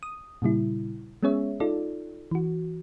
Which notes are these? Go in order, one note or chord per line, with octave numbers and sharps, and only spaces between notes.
D#6
A#2 C#3 G3 E4
G#3 B3 C#4 G#4 C#5 E5
D#4 F4 A4 D5
E3 F#4